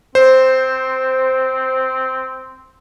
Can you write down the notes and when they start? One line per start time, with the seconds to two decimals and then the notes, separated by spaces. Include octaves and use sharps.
0.15 C4 C5